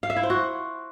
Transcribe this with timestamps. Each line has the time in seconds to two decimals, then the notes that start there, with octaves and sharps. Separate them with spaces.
0.03 F5
0.10 E5
0.16 E4
0.23 C5
0.30 F#4